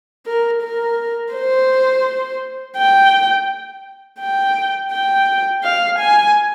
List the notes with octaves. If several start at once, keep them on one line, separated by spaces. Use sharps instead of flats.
A#4
A#4
C5
G5
G5
G5
F5
G#5